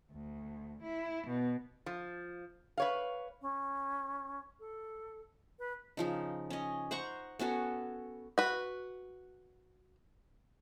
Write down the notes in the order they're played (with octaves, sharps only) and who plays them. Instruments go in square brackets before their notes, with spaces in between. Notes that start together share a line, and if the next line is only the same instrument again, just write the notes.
[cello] D2
E4
B2
[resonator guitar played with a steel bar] F3
B4 C#5 F5
[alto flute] C#4
A4
B4
[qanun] C#3 F3 D#4
C#4 D#5
C5 F#5 A#5 C#6
B3 C#4 F#4 A4
[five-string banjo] F#4 B4